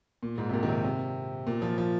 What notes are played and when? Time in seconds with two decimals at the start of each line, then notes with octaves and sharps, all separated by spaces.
0.23 A#2
0.38 G#2
0.49 C3
0.53 A#2
0.63 D#3
0.69 C3
0.84 C3
1.47 A#2
1.62 F3
1.78 F3